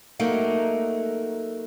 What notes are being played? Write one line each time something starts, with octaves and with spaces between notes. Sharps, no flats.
F#3 A3 A#3 D#4